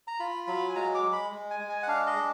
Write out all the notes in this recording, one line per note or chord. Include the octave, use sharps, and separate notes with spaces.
A#5
F4 B5
F#3 B5
G#5
G#3 A#5
D6
G#3
B5
G#3
G#5
G#3
G#5
F#5
D4 F5
D#5
G#3